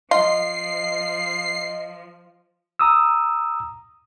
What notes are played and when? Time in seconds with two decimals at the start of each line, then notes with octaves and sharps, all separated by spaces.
0.11 F3 F4 D#5 C7
2.79 A#5 D#6 E6